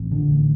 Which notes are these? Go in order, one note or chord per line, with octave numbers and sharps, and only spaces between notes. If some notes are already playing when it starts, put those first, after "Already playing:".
Already playing: A1 C4
D3
A1